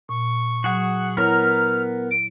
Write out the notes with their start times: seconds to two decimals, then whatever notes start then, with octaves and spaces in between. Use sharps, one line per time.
0.09 A#2 C#6
0.64 F#3 F#4 G#4 F#5
1.17 B3 E4 A#4 C#5 F#5 A#5 F6
2.11 D7